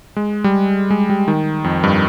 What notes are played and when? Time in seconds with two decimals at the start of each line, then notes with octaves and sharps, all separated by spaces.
0.16 G#3
0.44 G3
0.91 G#3
1.10 G3
1.28 D#3
1.64 F2
1.84 G2